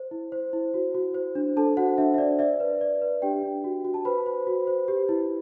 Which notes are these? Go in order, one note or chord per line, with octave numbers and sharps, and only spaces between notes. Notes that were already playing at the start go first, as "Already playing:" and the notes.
Already playing: C5
E4
C5
E4
F#4
F#4
C5
D4
D4 A4 A5
F#4 C5 F#5
D4 E5
E5
D4 D5
D5 E5
B4
D5
B4
D4 G4 G5
D4
F#4
F#4
A5
B4 C5 B5
C5
F#4
C5
G4
E4